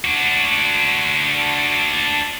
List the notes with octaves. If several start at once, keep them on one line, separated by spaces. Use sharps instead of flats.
D4 F#4